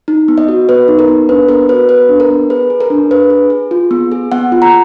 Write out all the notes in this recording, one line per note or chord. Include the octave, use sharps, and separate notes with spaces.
D#4
B3
D#5
F#4
B3 B4
D#4
A#4
B3
D4 B4
B3 A#4
F#4 B4
B3 B4
D4
A#4
B3
G#4 B4
G#4
A#4
D4
D4 B4
G#4
G#4
F4
B3
G#4
B3 F#5
F4
A#5